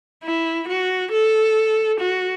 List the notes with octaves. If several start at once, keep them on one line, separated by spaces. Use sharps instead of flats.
E4
F#4
A4
F#4